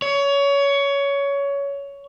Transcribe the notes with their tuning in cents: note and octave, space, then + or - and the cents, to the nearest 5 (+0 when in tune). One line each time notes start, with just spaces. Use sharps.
C#5 +20